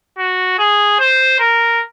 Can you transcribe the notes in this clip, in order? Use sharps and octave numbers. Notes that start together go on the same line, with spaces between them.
F#4
G#4
C5
A#4